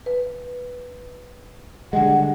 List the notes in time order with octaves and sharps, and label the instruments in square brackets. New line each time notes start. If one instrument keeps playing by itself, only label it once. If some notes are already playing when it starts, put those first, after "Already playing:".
[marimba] B4
[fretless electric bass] D3 G3 G#3 [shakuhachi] F#5